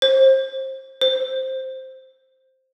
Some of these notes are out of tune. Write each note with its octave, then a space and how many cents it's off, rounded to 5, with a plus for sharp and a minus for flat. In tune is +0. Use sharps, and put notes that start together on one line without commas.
C5 +30
C5 +0